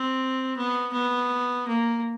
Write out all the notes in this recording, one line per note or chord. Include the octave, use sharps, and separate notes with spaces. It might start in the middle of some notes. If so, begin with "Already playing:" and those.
Already playing: C4
B3
B3
A#3